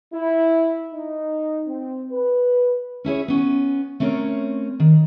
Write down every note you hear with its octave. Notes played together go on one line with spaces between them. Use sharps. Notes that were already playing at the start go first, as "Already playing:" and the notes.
E4
D#4
C4
B4
C#4 E4 G#4 C#5
B3 C#4
A3 C4 C#4 A#4 C#5
D#3